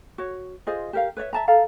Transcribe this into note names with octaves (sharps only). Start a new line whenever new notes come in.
F#4 C#5
F4 G#4 C5 D#5
G4 A#4 F5
B4 C#5 D5 E5
E5 A5 A#5
A4 F5 A#5